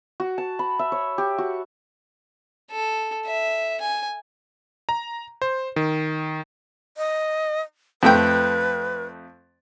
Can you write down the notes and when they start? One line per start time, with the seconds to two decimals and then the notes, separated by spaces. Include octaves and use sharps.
0.20 F#4
0.38 A5
0.59 B5
0.79 E5
0.92 C#5
1.18 G4
1.38 F#4
2.71 A4
3.26 E5
3.81 G#5
4.89 A#5
5.42 C5
5.76 D#3
6.97 D#5
8.03 F2 A3 B4 G5